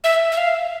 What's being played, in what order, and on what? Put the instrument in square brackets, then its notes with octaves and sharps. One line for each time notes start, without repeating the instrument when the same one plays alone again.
[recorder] E5
E5
F5